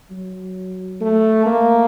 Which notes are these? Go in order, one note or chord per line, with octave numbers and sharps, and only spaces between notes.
F#3
A3
A#3